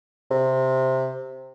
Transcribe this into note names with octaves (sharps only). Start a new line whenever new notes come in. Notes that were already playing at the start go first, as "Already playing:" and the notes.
C3